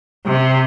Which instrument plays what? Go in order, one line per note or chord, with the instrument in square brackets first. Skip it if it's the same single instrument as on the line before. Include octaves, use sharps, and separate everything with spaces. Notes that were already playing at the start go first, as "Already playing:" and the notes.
[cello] C3